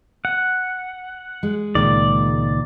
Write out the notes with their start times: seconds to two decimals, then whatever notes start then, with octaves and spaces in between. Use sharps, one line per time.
0.25 F#5
1.43 G#3
1.75 C#2 A#2 D#3 D5